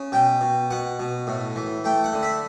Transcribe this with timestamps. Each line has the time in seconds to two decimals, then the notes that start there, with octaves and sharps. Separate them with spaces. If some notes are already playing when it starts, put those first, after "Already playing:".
Already playing: C#3
0.12 B2 G5
0.41 B2
0.70 B2 F#5
0.99 B2
1.27 A2
1.56 E3
1.84 A3 G5
2.04 F#5
2.13 D3
2.23 E5